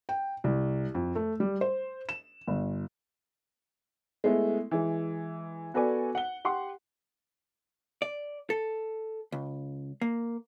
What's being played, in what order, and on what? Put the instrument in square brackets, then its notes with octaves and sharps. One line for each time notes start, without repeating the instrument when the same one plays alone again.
[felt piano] G5
C2
F2
A3
G3
C5
E7
G1
[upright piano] G#3 A3 B3 E4
E3 G#3
B3 F#4 A4 B4 D5 G#5
F#5 G7
G4 F#5 C6
[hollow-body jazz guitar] D5
A4
C#2
A#3